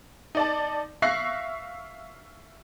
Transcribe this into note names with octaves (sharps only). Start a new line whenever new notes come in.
D#4 D5 A5
E5 F5 C#6 F#6 A#6 C7